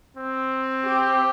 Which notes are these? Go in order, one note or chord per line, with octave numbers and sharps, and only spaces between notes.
C4
G4